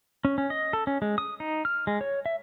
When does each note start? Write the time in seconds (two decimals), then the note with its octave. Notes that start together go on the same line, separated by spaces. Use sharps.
0.25 C#4
0.38 C#4
0.50 D#5
0.73 A4
0.87 C#4
1.02 G#3
1.18 D#6
1.40 D#4
1.65 F6
1.87 G#3
2.01 C#5
2.26 E5